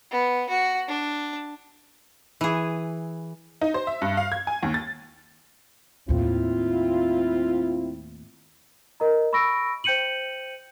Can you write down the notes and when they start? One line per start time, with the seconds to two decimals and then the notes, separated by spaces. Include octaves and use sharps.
0.11 B3
0.50 F#4
0.88 D4
2.41 E3 G#4
3.61 D#4
3.74 C5
3.87 E5
4.02 G2
4.17 F5
4.32 G#6
4.47 G#5
4.63 D#2
4.74 A6
6.09 D#2 A2 C4 E4 F4
9.00 A#4 D#5 A#5
9.33 B5 C#6 E6 A#6 D7
9.84 C5 G5 G6 C#7 D#7 F#7